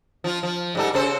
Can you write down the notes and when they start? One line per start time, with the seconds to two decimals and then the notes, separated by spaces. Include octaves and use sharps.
0.24 F3 F4
0.43 F3
0.75 G#2 G3 A4
0.94 C#3 A4 C5